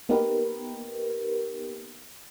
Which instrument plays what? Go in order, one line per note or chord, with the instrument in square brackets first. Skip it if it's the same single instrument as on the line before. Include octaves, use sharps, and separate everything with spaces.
[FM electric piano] A#3 B3 D#4 G4 A#4 B4